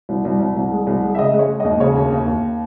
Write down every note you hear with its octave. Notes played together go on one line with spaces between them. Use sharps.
C2
C2
C2
C2
G#3
C2
G#3
E5
C#3 D#5
G#3
C#5
G#3
D#2 D#5
C#3 C#5
D#2
D#2
D#2